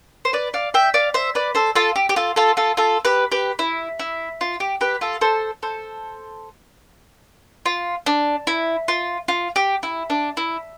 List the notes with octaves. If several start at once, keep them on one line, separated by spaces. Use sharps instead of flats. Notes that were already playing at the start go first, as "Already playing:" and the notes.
C5
B4 D5
D5 F5
E5 G5
D5 F5
C5 E5
B4 D5
A4 C5
F4 A4
G4
G4
F4 A4
F4 A4
F4 A4
F4 A4
G4 B4
G4 B4
E4
E4
F4
G4
G4 B4
F4 A4
A4 C5
A4 C5
F4
D4
E4
F4
F4
G4
E4
D4
E4